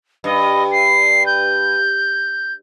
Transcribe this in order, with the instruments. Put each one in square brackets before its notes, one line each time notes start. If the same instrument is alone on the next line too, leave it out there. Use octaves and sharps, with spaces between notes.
[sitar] G2 [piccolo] D#5
[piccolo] C7
G6